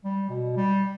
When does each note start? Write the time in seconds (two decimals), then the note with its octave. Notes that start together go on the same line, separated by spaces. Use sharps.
0.05 G3
0.29 B2
0.57 G3